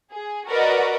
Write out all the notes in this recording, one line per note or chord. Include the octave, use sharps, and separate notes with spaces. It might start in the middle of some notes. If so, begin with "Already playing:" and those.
G#4
F#4 A#4 B4 D5 D#5